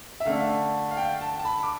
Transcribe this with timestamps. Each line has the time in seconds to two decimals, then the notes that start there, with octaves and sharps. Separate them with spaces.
0.20 E5
0.25 D3 A3 D4 F5
0.91 F5
0.97 G5
1.21 A5
1.40 A5
1.45 B5
1.63 D6